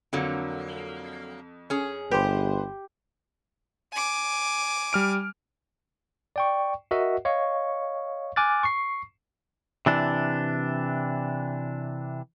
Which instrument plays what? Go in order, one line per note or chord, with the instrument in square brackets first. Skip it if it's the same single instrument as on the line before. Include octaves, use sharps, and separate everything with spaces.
[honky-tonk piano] F2 [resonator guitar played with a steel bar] D3 F#3 A#3
[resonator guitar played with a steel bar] C#4 G#4
[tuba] G1 [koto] G4 [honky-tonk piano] B4 C5
[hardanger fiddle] G#5 D6
[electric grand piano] G3 F6 D7
[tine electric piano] D5 G5 C#6
F#4 A#4 D#5 E5 F#5
C#5 D#5 F5 C#6
G#5 D6 F6 F#6 A6
C#6 C7
[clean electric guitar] C3 E3 D4